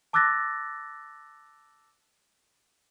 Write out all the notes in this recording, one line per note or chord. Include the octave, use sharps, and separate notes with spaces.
A5 D6 E6 F#6 A6 A#6